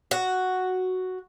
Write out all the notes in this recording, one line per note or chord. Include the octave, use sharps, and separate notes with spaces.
F#4